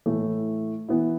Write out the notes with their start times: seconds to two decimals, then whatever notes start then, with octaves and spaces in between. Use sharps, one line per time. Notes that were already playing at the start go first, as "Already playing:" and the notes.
0.06 A2 E3 A3 E4
0.89 E3 B3 E4